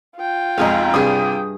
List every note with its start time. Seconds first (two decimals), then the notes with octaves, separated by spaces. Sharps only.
0.17 F4 G5
0.58 B1 F2 G#3 G#4 F5 A#5
0.94 G2 C3 G#4 D#6